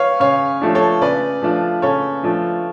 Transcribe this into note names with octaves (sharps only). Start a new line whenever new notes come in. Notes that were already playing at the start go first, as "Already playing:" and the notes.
Already playing: B4 C#5 F5
C#3 C#5 F5
F3 A3 D4 F4
A4 C#5
C#3 B4 D5
F3 A3 D4 F4
C#3 A4 C#5
F3 A3 D4 F4